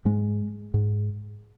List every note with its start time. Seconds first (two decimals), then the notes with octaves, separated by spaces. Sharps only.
0.05 G#2 G#3
0.74 G#2